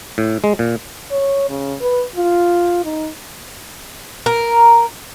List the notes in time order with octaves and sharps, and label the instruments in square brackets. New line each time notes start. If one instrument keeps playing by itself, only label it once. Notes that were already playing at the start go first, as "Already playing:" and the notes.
[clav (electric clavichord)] A2
G#3
A#2
[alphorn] C#5
C#3
B4
F4
D#4
[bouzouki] A#4